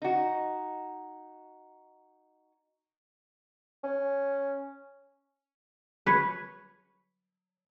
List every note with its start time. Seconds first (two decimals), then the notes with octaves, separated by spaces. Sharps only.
0.02 D#4 F#4
3.84 C#4
6.06 B4 C#5